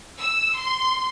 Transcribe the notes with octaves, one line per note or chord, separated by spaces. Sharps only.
E6
C6